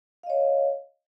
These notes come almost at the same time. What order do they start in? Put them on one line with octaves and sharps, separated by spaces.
F5 D#5 C#5